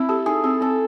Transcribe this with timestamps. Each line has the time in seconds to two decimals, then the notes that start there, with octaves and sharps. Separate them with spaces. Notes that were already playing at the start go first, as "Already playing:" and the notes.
Already playing: C4 E4
0.09 G4 A4
0.26 D#4 G#4
0.44 C4 A4
0.61 C4 A4